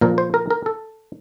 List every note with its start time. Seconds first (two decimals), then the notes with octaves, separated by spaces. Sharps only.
0.01 A#2 F3 A#3 A#4
0.18 C5
0.34 A#4
0.50 A#4
0.66 A4